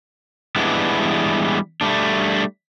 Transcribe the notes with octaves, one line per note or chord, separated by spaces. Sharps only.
E3 G3 G#3 B3 D4 E4
G3 A3 D4